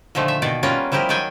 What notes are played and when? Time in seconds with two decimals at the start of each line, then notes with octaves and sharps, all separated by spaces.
0.15 A#2 D3 D#3 F3 A3
0.28 E5
0.42 B2 D#3 A#3 D5
0.63 G3 A#3 B3 C#4 F4 A#4
0.92 F3 G3 E4 G4 A#4 D#5
1.09 D#3 F#3 D5 G5 G#5